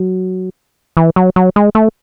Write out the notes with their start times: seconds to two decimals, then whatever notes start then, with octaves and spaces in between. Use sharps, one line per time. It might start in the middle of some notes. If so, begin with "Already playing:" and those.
Already playing: F#3
0.97 E3
1.16 F#3
1.36 F#3
1.56 G#3
1.75 A3